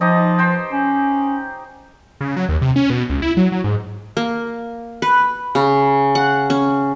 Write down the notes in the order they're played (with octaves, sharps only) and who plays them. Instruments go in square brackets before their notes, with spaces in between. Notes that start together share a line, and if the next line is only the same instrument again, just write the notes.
[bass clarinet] F3 [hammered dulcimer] D#4 G4 D#5
[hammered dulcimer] C5 G5
[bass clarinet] C#4
[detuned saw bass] C#3
F#3
D#2
C3
C#4
B2
C#2
E4
F#3
F#3
G#2
[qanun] A#3
B4
C#3
F#5
C#4